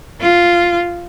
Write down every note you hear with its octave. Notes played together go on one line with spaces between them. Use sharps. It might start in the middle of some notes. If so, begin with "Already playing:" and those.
F4